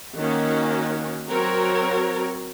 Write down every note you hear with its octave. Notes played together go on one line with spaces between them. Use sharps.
D#3 A#3 C#4 F#4
F#3 C4 F#4 A#4 C#5